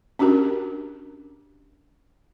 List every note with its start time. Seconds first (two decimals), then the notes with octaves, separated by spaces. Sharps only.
0.19 C#4 D4 F#4 G4 A#4